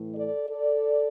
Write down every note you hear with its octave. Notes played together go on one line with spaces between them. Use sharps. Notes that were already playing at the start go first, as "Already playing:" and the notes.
Already playing: A2 E3 A3
A4 D5
A4 D5